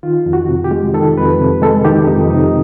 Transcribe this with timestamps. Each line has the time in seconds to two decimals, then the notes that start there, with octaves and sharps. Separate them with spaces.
0.03 D#3 F4
0.26 F2
0.33 F#4
0.49 C3
0.64 G4
0.71 G#3
0.94 D#3 A4
1.17 F2 B4
1.40 C3
1.62 G#3 A4
1.85 D#3 G4
2.07 F2 D#4
2.30 C3 D#4